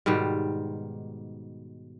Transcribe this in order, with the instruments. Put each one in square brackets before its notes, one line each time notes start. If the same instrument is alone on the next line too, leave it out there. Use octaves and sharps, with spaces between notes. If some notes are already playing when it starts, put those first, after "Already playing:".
[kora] G#2 B2 D#3 G3